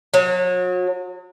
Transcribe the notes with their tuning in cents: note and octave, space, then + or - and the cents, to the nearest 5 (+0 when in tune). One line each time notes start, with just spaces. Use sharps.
F#3 -35